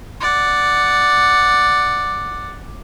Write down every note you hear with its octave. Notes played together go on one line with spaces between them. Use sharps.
D5 F#5